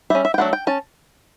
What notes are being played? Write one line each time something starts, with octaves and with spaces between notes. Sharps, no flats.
G3 C#4 E5
E5
G5
F#3 A3 D4 F#5
G5
C#4 A5